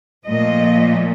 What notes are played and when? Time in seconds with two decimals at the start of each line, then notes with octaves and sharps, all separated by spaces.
0.25 A#2 F3 A3 D#5